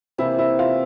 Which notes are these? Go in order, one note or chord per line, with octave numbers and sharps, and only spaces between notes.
C3 E3 A#3 E4
E4
F4